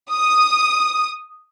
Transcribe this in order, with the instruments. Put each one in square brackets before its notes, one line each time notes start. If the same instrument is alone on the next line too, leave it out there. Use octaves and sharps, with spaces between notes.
[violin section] D#6